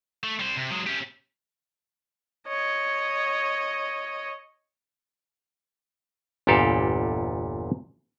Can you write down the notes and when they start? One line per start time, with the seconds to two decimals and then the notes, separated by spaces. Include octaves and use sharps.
0.24 A3
0.40 G3 C5
0.57 C3
0.71 F#3 G#3
0.87 C#4 G4
2.48 C#5 D#5
6.47 G1 E2 A#2 G4 A4 F5